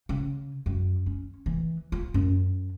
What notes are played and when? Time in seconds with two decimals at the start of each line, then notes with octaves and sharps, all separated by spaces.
0.09 C#3
0.66 F#2
1.06 C#4
1.46 E3
1.92 F4
2.14 F#2